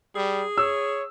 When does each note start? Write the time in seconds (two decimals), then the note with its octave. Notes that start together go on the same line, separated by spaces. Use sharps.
0.16 G3 G#4
0.58 C#5 E6